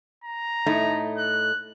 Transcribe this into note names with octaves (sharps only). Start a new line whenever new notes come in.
A#5
A2 A3 D#4
F#6